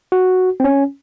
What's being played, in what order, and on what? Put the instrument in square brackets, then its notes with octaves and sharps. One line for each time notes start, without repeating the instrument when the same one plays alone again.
[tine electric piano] F#4
C4
C#4